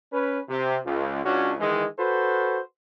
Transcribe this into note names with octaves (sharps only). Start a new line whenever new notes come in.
C#4 B4
C3
C#2
C#2 C#4 D4 F#4
D#3 E3 G#3
F#4 A4 B4 C5